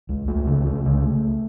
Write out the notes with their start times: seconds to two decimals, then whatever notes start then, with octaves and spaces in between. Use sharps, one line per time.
0.09 C#2
0.27 C#2 A3
0.47 C#3
0.66 C#2
0.85 C#3